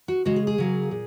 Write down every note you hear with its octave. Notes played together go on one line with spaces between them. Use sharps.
F#4
C#3 G#3 F#4
G#4
G#4
C#3 F#3 A#3
A#2